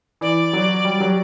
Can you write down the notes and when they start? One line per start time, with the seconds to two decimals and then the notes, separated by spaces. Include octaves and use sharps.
0.21 E3 D5
0.53 F#3
0.85 G3
1.00 F#3